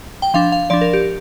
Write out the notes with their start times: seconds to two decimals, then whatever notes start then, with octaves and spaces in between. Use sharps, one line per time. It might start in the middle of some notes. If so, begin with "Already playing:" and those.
0.22 G5
0.34 F3 D4 F5
0.52 F5
0.70 F3 D4 D5
0.81 A#4
0.93 G4